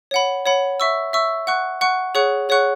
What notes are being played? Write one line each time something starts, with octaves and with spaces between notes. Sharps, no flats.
C#5 F#5 B5
C#5 F#5 B5
E5 C#6 E6
E5 C#6 E6
F#5 C#6 F#6
F#5 C#6 F#6
G#4 C#5 F#5 C#6 F#6
G#4 C#5 F#5 C#6 F#6